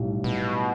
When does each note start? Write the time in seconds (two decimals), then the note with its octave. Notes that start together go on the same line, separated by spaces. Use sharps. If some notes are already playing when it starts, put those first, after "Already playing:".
Already playing: B1 A2 G3
0.24 B2